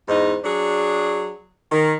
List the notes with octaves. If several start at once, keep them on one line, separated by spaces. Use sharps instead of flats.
E2 G#2 D#4
F#3 D4 G#4
D#3